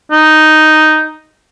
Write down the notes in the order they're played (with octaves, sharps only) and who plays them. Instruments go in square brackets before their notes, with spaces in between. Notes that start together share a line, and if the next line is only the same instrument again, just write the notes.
[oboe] D#4